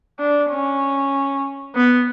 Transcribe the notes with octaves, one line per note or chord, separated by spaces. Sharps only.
D4
C#4
B3